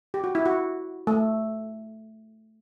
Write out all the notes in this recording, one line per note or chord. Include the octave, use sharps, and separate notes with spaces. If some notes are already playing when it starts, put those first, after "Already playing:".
G4
F#4
E4
F#4
A3